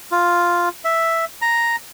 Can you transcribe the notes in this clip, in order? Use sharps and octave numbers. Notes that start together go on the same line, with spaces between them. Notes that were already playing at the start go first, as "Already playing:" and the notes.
F4
E5
A#5